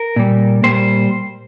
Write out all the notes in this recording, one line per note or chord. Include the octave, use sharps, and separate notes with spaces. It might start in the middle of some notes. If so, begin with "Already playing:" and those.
Already playing: A#4
A#2 G3
A#2 G3 C5